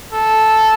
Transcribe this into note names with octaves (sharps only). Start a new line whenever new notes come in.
A4